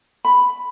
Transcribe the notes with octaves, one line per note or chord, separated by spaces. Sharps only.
B5